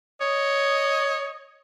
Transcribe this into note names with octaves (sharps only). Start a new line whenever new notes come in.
C#5 D#5